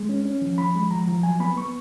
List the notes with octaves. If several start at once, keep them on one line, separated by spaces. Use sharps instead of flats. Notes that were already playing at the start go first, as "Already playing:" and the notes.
Already playing: G#3
C#4
C#4
F3
F3 B5
G#3
F3 A#5
F3
F#3 G#5
B3 B5
B3 C#6